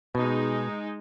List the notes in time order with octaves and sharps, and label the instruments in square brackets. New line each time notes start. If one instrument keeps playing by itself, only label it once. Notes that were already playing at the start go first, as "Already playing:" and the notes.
[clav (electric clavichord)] B2 [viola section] G#3 D#4